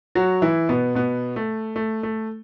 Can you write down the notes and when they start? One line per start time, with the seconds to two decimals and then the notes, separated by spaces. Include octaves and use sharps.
0.15 F#3 F#4
0.42 E3 E4
0.69 B2 B3
0.95 B2 B3
1.36 A3
1.76 A3
2.03 A3